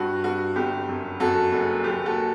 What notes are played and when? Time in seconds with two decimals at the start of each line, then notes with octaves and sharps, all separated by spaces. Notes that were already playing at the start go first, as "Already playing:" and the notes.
Already playing: G2 F#4
0.24 G2 F#4
0.56 G1 G4
0.88 F#2
1.20 F#2 F#4 A4
1.52 F#1
1.84 D#2 G4
2.06 F#4 A4